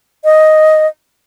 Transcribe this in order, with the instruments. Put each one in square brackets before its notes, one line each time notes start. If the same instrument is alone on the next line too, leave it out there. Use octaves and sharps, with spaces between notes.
[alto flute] D#5